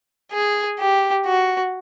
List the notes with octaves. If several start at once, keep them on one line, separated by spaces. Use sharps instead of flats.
G#4
G4
F#4